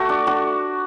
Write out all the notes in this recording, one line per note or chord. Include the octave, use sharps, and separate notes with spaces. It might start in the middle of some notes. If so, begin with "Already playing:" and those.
Already playing: A3 F#4
D4
D4 F#4